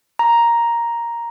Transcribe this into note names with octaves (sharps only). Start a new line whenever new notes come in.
A#5